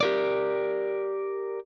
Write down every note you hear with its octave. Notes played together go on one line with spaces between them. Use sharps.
G4 A#4 D5